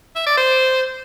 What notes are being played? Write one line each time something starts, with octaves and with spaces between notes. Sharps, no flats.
E5
D5
C5